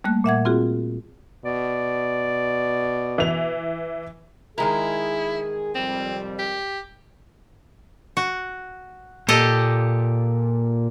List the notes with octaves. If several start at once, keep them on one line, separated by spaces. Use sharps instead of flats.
G3 A3 A#3 F#6
A#2 E5 F#5 G#6
C4 F4 F#4 G#4
B2 D5
E3 F7
D#3 G#3 E4 G#4 A#4
F2 C3 G3 C4
G4
F#4
A#2 G4 A4 D#5